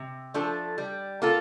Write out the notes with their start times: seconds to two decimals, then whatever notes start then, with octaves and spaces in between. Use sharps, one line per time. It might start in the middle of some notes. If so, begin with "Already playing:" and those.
Already playing: C3
0.34 F3 A3 D4 A4
0.78 G3
1.22 A#3 F4 A4